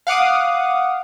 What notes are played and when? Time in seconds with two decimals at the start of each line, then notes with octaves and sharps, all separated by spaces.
0.07 F5 F#5 D6 D#6